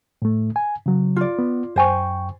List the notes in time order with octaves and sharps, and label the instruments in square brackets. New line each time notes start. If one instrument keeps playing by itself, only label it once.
[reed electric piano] A2 A3
G#5
C#3 F#3
[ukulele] F4 D5
[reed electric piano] B3
[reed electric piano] F#2 G5 C#6 [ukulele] C5 G#5